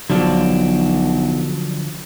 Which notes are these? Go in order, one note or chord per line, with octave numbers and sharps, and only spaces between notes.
B1 D3 F3 F#3 D4